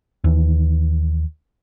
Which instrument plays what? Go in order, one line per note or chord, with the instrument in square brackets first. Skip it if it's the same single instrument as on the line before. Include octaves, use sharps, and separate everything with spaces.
[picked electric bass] D#2 E3